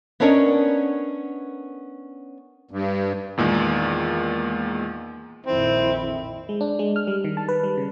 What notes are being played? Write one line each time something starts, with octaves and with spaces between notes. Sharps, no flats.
B3 C#4 D4 A#4 C#5 D#5
G2
E2 A#2 D#3 G#3
A#1 F2 D#3 C4 E4
G#3
D4
G#3
F6
G3
D#3
A5
B4
G3
C#3